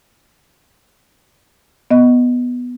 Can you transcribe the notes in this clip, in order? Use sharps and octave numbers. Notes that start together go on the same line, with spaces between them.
B3 D#5